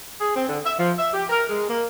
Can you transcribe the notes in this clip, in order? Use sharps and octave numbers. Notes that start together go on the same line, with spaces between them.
G#4
C4
D3
E5
F3
E5
G4
A#4
G#3
A#3